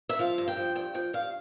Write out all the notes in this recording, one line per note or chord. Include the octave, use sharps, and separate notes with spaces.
E5
F3 F5
G2
G5
F3
G2 G5
F3 G5
G2 F5